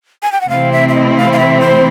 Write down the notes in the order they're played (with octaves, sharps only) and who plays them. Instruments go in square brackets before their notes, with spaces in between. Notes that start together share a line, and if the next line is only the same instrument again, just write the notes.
[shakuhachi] G#5
G5
F#5
[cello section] C3 E3 A3 C4 E4 [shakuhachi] F5
[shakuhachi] E5
E5
D#5
F5
F5
E5
C5